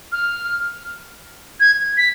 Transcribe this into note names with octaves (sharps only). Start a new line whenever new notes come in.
F6
G#6
B6